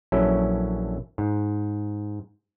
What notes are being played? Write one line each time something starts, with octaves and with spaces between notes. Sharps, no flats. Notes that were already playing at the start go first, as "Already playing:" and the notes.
A#1 F#3 C#4 E4 A4
G#2